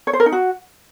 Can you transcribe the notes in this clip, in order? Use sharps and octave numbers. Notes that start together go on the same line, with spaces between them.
C#5
C5
A#4
D#4
F#4